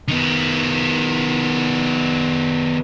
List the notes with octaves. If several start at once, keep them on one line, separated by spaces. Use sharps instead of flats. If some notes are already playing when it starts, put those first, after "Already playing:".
D#3 B3